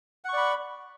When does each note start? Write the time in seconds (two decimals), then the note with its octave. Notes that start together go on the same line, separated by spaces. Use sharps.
0.24 F#5
0.29 C#6
0.33 D5
0.37 B5